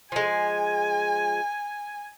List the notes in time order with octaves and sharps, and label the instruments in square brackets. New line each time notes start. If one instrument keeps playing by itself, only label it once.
[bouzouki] F3 G#3 [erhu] G#5